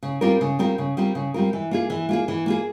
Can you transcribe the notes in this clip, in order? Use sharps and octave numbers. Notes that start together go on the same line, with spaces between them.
C#3
G3 C4 F4 A#4
C#3
G3 C4 F4 A#4
C#3
G3 C4 F4 A#4
C#3
G3 C4 F4 A#4
E3
A#3 F4 G#4
E3
A#3 F4 G#4
E3
A#3 F4 G#4